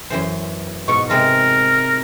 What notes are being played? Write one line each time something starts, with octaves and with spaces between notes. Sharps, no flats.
F#2 E3 C5
G#2 B2 C#6
C3 G#3 F4 A#4